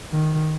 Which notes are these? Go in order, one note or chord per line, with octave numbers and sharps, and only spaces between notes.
D#3